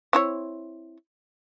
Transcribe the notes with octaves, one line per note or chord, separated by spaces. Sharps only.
C4 E4 C#5